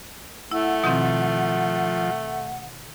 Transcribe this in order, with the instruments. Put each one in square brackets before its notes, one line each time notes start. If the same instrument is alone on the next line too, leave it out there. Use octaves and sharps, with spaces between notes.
[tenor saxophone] A3 [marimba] E4 [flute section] F#5
[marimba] B2 D#3 C4 [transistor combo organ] F3